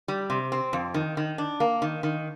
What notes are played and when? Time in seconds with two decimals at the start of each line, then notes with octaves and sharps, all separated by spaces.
0.08 G3
0.30 C3
0.52 C4
0.73 F2
0.94 D#3
1.17 D#3
1.38 D4
1.60 A#3
1.82 D#3
2.03 D#3